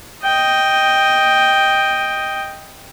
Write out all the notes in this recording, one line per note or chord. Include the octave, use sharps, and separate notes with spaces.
D#5 G5